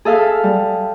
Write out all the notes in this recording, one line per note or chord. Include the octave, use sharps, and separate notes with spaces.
G#4 A4 E5 F5
G3